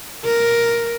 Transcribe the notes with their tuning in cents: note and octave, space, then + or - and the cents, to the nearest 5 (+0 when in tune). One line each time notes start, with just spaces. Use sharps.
A#4 +5